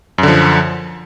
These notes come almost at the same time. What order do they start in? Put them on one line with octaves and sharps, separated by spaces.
F#2 D3 F3